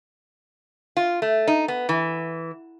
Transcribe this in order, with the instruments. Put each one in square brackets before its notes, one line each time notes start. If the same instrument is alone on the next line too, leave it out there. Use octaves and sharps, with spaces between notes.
[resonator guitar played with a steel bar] F4
A3
D#4
B3
E3